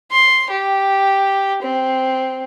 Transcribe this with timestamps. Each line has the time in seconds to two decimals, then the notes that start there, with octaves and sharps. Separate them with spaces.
0.11 C6
0.50 G4
1.62 C4